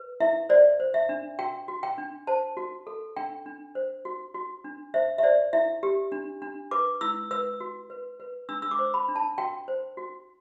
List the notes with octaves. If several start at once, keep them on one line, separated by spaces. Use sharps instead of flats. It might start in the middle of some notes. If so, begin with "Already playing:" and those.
Already playing: B4
E4 E5
C5 D5
C5
E5
D4
F#4 G5
F#4
G5
D4
C5 A5
F#4
A4
D4 G5
D4
C5
F#4
F#4
D4
C5 E5
E5
C5 D5
E4 E5
G4
D4
D4
B4 D6
E4 E6
B4 E6
F#4
B4
B4
D4 E6
E6
D6
C5
B5
D4
A5
F#4 G5
C5
F#4